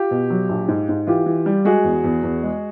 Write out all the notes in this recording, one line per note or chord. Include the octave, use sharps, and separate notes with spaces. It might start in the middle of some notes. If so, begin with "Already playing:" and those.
Already playing: F4 G4
B2
F#3
A#1
G#2
G#2
E3 F4 G4
E3
G3
G#3 F#4 G#4
E2
E2
E2
G#3